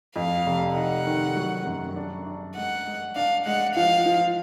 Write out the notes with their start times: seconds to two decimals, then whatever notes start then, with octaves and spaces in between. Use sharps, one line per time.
0.16 F2 F5
0.46 F1
0.76 D#4 F#5
1.07 D#3
1.36 F#3
1.66 F#2
1.96 D4
2.26 D4
2.56 G#3 F#5
2.86 G#3
3.16 D4 F5
3.46 G#3 F#5
3.76 F3 F5
4.06 F3